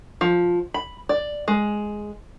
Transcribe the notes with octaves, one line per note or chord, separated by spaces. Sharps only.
F3
B5
D5
G#3